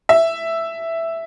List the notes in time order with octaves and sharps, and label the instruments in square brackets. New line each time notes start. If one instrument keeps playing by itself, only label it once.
[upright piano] E5